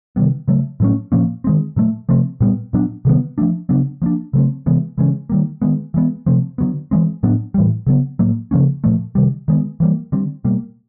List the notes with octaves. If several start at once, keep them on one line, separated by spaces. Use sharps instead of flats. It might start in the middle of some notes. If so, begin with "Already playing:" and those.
C3 D#3 G3 B3
C#3 F#3 A3
A2 F#3 A3 C#4
A#2 F3 A#3 C#4
D#3 G#3 C4
A#2 F#3 A3
C3 F3 A3 C4
A#2 G3 B3
A#2 F#3 B3 D4
C3 D#3 G3 B3
F3 A3 D4
C#3 F#3 B3 D4
F3 A#3 D4
C#3 F#3 A3 C4
C3 E3 G#3 B3
C#3 E3 G#3 C#4
D#3 G3 A#3
D#3 G#3 B3
E3 G#3 B3
C3 F3 A3 C4
D3 F#3 B3
E3 G#3 C4
A2 F#3 B3 D4
A2 E3 G3
C#3 F#3 B3
A2 F#3 A#3
C#3 F3 A#3 C#4
A#2 F3 A3
C3 D#3 G3
D#3 G#3 B3
E3 G3 A#3
D3 G3 C4
B2 G3 A#3